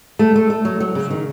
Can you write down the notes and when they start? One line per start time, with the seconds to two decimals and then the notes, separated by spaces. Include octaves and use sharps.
0.19 A3
0.36 A3
0.50 A3
0.65 F#3
0.80 F#3
0.95 C#3
1.11 D#3